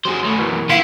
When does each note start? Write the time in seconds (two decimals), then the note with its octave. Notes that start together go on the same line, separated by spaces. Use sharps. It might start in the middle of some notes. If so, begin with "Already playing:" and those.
0.05 F#2 F#3 G4 G#4 C5
0.25 F#2 B2 A3
0.39 E3 A#3
0.70 B3 E4 F4 F5